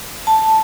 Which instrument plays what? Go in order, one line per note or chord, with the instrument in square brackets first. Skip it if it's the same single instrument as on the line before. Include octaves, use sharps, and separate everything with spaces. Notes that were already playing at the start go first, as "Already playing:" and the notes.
[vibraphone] A5